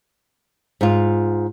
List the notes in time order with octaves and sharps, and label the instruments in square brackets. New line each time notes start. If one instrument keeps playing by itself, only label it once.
[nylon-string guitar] G#2 F4